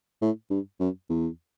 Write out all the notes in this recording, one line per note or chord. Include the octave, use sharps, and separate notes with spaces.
A2
G2
F#2
E2